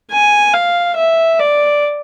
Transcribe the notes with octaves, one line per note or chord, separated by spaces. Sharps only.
G#5
F5
E5
D5